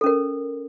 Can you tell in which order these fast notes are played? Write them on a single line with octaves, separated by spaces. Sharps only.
A4 C#4 A#4